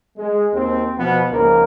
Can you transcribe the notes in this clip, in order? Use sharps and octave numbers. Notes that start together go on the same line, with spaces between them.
G#3
D#2 C4
B2 F3 B3
C#2 G#2 F3 A#3 A#4